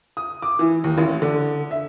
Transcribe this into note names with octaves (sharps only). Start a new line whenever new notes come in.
D#6
D6
E3
D#2
A1
D3
E5